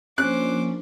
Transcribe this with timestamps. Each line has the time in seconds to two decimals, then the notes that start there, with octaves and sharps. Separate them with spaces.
0.18 F3 A#3 C#4 D4 C5 D6 F#6